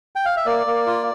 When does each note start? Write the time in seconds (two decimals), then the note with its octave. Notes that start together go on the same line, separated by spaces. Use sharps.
0.16 G5
0.25 F5
0.37 E5
0.46 A#3 D5
0.66 A#3
0.87 F4